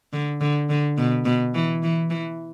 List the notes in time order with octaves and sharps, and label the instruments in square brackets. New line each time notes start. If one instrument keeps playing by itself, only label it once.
[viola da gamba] D3
D3
D3
B2
B2
E3
E3
E3